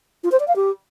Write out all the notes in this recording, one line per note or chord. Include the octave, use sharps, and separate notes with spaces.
F4
C5
D5
F5
G4